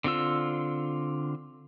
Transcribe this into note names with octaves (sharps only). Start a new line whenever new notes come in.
D3 C4 F4 E6